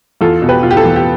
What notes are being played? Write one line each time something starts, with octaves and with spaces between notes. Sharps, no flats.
E2 F4 A4
B2
G4 B4
B2 F4
G4
F4 A4
E2
G4